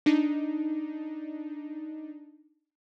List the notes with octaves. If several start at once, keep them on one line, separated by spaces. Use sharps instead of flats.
D4 D#4